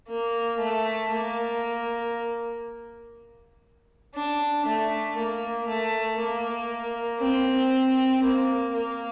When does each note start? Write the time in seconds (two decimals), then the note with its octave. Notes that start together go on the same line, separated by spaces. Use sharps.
0.08 A#3
0.59 A3
1.10 A#3
4.15 D4
4.66 A3
5.17 A#3
5.68 A3
6.19 A#3
7.21 C4
8.23 A#3
8.74 A#3